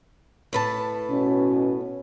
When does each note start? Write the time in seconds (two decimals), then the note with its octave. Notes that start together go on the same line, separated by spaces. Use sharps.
0.53 A2 B4 A5
1.10 B2 C#4